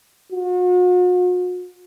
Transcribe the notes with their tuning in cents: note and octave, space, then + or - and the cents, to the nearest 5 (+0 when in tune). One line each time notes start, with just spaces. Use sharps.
F#4 -45